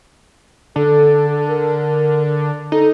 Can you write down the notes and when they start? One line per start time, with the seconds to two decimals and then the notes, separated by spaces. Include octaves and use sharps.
0.76 D3 A4
1.48 A#4
2.72 D#4 A4